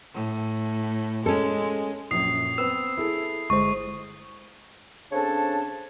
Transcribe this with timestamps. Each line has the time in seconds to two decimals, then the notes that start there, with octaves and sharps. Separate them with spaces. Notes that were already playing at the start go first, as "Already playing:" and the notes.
0.15 A2
1.26 G#3 C#4 A4
2.11 A#1 F#2 D#6 C7
2.58 B3 C4 E6
2.97 E4 G#4 A4
3.50 G1 G#3 C5 C#6
5.12 C#3 C4 D4 A4 C#5 A5